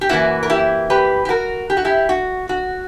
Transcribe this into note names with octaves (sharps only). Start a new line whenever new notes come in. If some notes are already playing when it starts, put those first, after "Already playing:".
G4
F#2 E3 A#3 E4 F#4
A#4
E4 G4
G4 B4
G4
F#4 A#4
G4
F#4
E4 G4
F#4
F#4